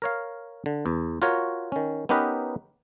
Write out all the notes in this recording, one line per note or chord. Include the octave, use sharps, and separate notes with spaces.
A#4 C#5 F5
D3
E2
F4 F#4 A#4 C#5
D#3 C#4
B3 C#4 D#4 G4 A#4 B4